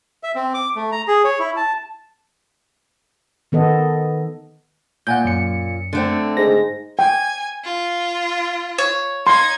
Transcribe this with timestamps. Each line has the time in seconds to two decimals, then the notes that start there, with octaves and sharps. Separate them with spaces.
0.23 E5
0.35 C4
0.54 D6
0.76 A3
0.92 A#5
1.08 G#4
1.24 C#5
1.39 E4
1.57 A5
3.52 D#3 B3 A4 D#5
5.07 A#2 F#5 G#5 G6
5.24 F#2 C#7
5.93 D3 A3 C4
6.37 G#2 A#6
6.99 G5 G#5
7.64 F4
8.78 C#5
9.27 D#4 C6 G#6